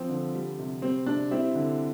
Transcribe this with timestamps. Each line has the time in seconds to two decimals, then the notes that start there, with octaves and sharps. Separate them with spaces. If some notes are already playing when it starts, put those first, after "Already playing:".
Already playing: F3 C4
0.09 D3
0.34 G3
0.59 C3
0.82 G3 C4
1.06 C3 D4
1.31 G3 C4 E4
1.55 D3